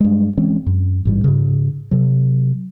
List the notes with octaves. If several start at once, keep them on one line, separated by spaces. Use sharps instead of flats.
G2 G#3
E3 G#3 C4 C#4
F#2
A1 G#2 G3
G#2 C#3
C3 F#3